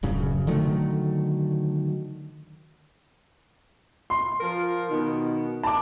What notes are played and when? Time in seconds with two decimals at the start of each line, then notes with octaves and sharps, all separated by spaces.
0.03 D1 F#2 C#3
0.47 D3 D#3 F#3 A3
4.10 C6
4.41 F3 F4 A#4
4.91 B2 D#3
5.63 A5 D6